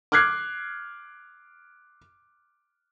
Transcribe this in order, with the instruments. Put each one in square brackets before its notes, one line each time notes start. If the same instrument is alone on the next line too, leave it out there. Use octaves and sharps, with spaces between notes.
[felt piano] D6 F6 F#6 G#6 C7